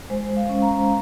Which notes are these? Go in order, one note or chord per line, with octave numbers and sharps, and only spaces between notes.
G#3 C5
F5
C#4
A#5